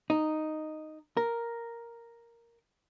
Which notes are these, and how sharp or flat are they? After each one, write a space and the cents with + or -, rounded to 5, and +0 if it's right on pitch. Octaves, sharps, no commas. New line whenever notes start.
D#4 -5
A#4 +0